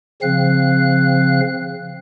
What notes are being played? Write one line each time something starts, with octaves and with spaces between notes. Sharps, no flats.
C#3 F3 C4 F5 F#6